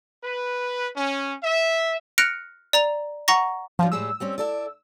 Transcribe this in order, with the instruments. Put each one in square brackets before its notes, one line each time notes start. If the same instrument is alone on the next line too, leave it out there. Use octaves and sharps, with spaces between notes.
[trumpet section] B4
C#4
E5
[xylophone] F6 F#6 A#6 C#7 D7 F7
D5 A#5 F7
F#5 A#5 C#6 A#6
[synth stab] F3 [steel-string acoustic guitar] F#3 D4 F4
[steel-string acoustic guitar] A2 G3 G#3 [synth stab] E6
[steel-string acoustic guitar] G3 C4 C#4
E4 A4 D5